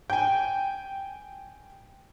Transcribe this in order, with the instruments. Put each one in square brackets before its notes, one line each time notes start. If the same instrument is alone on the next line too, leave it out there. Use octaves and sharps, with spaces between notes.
[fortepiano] G5 G#5